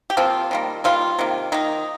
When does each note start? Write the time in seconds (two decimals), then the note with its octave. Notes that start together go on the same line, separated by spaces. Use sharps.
0.10 G4
0.17 C3 F3 A#3 C4 F4
0.51 D#3 G3 A#3
0.84 D#3 G3 A#3 C4 F4
1.19 C3 D#3 A#3
1.52 D#3 A#3 D#4